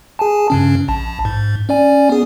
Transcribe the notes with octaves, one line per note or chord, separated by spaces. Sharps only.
G#4 G#5 A5
G2 C#3 C#4
A#1 A5
G#2
C#4 D5 G#5
B3 G#4